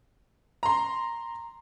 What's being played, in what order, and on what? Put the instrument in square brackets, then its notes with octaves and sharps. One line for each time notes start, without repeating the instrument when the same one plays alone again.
[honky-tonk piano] A#5 C6